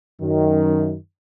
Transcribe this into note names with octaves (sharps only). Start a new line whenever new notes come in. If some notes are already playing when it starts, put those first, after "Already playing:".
F#2 D#3